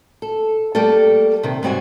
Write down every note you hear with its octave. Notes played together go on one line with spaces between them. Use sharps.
A4
G3 A3 A#3 A4
C3 D#3
G#2 G3 C4 F#4 G#5